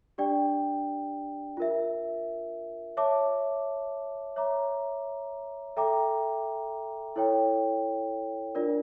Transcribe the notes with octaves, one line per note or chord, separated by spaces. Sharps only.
D4 G4 D5 G5
F4 A#4 E5
C#5 E5 A5 D6
C#5 E5 A#5 D6
A4 E5 G5 A#5 D6
E4 A4 C#5 G5
D4 F4 A#4 D5